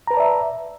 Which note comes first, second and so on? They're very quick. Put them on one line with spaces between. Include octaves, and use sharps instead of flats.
A#5 B4 A5 D5 E5